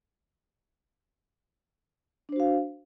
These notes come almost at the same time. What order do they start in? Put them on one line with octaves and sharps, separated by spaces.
D4 C5 F#4 F5